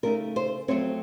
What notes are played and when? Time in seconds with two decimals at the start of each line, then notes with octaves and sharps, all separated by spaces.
0.03 C#3 A3 D#4 A#4
0.36 C5
0.68 F2 D#3 F#3 A3 C4 C#5